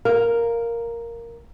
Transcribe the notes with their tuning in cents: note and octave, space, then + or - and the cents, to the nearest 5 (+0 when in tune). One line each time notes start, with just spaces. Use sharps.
A#4 +0 F5 +0